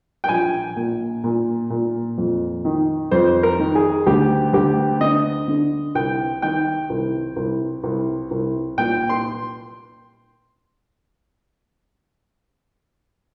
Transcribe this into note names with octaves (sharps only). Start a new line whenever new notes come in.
G5
A#1 G#5
A#2
A#2
A#2
F2
D#3
F2 C5
A#4
D#3
G#4
D2 G4
D2 G4
D3 D#5
D3
C2 G5
D#3 G5
C2
C2
C2
C2
A#2 G5
C6